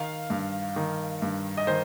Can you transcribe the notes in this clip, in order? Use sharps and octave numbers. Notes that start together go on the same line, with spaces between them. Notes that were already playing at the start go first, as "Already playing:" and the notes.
Already playing: D#3 F5
G2
D#3
G2
D#5
D#3 C5